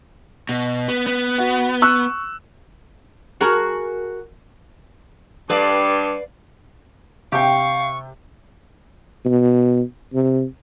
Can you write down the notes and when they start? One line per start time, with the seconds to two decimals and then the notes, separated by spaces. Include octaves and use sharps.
0.49 B2
0.88 B3
1.06 B3
1.38 F#4
1.82 C#6 E6 F#6
3.41 F#4 G#4 A#4
5.49 G2 B4 D5 F5
7.32 C3 G4 F5 G5 C#6
9.25 B2
10.14 C3